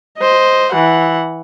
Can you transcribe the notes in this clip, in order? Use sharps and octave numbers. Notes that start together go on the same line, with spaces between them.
C5 D#5
E3 F#5